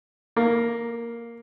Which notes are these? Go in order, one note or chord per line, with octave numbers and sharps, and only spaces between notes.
A#3